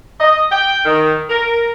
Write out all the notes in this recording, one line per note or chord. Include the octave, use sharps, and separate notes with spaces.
D#5
G5
D#3
A#4